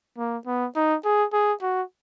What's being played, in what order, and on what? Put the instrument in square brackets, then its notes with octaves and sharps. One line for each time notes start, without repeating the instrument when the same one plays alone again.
[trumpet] A#3
B3
D#4
G#4
G#4
F#4